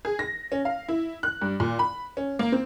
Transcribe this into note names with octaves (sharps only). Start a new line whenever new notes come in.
G#4
A#6
C#4
F5
E4
F#6
G2
A#2
B5
C#4
A#3
C4